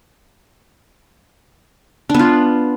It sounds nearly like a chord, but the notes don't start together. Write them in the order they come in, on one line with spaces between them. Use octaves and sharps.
D4 B3 F4